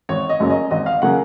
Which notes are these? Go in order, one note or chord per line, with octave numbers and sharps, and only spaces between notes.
G#1 C#5
D#5
F#2 C#3 F#3 A#3
D#5
G#1 D#5
F5
C#3 F#3 A#3 F#5